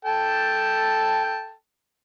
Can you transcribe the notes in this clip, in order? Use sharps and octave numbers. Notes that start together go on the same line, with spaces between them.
A4 G5 A5